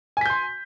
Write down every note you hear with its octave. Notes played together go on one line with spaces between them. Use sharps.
G#5 C6 G6 B6